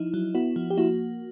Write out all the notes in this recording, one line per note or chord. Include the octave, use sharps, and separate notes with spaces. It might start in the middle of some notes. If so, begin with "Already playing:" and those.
Already playing: F3 D#4 E4
F#3
B3 E4 F#4
F3
G4
A#3 E4 F#4